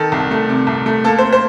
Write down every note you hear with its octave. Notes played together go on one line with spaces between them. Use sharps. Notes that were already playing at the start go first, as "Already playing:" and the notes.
Already playing: D#3 A4
C2
A3
C3
C2
A3
A#3 A4
C5
A#3
C5